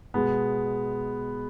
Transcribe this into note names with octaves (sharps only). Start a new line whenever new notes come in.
B2 G#3 B3